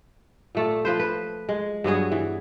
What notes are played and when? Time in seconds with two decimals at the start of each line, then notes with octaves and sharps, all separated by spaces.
0.55 A#2 A3 A4
0.85 F3 B4 C5
0.99 B4
1.49 G#3
1.84 G2 F#3 B3 G#4
2.12 E3